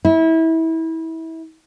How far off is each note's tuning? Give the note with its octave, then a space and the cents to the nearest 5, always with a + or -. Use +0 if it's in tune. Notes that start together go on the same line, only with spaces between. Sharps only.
E4 -25